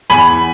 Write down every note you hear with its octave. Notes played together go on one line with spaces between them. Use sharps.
E2 G#5 B5